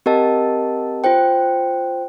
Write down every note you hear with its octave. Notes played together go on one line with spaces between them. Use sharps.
C4 G4 A#4 D#5 A5
F4 C5 G5